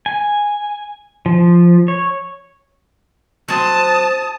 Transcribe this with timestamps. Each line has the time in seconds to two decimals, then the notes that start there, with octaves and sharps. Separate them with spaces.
0.06 G#5
1.26 F3
1.88 C#5
3.48 F#3 C4 A5 D#6